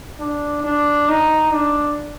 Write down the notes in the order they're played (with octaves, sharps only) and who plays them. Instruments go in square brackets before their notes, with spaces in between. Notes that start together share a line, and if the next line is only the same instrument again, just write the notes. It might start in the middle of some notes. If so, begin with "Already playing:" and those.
[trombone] D4
D4
D#4
D4